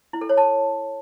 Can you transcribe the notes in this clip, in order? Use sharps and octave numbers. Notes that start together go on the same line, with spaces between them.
E4
A4
C#5
A5